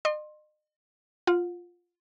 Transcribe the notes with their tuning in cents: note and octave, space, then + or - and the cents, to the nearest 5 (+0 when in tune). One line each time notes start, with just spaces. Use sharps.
D#5 -40 C6 +20
F4 +0 F#5 -35